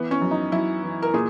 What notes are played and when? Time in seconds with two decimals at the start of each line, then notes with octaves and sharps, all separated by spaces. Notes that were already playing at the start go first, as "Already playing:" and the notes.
Already playing: E3 B3
0.11 C#4
0.22 F#2
0.31 D#4
0.52 F#2 E4
0.83 E3
1.02 A#4
1.14 A#2 G#4